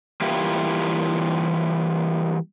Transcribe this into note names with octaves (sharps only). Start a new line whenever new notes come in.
E3 G3 A#3 E4 F4 G4